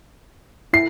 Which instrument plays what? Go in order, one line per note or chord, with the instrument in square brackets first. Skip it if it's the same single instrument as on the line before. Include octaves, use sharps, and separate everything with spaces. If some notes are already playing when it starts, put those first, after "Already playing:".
[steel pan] E4 [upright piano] C7